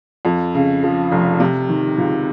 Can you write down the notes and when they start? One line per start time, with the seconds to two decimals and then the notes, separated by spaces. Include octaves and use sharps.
0.25 F2
0.55 C#3
0.83 F3
1.12 F1
1.40 C3
1.69 D#3
1.98 C#2